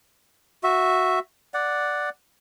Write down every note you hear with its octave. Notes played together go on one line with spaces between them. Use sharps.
F#4 E5
D5 F#5